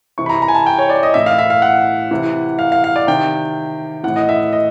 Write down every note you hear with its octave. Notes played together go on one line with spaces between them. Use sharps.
C3 E3 C#6
B5
A#5
A#5
G#5
A5
G5
C#5
D5
D#5
A2 E3 E5
F5
E5
F5
F#5
C3 E3
F5
F5
F5
D5
C3 D#3 G5
A2 E3 F#5
D#5
E5
D#5